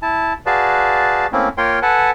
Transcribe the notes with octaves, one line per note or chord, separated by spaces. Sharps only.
E4 A5
F#4 G#4 B4 D5 F5 A5
A3 A#3 C4 C#4 E4
A#3 F4 A#4 C#5 G5 C6
A4 B4 F#5 G#5 A5